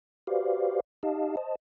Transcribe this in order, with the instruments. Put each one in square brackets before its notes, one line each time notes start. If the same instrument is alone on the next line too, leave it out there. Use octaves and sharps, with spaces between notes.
[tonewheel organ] F#4 G4 B4 C5 D5 F5
D#4 G4 D#5 F5 A5
C5 D#5 A5